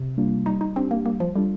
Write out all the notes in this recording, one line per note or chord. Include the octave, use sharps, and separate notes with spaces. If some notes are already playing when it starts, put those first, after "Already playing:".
Already playing: C3
G3 A#3 D4 F4
G3 D#4
D#4
C4 D4 G4
A#3
G3 A#3
F3
G3 D4 F4 A4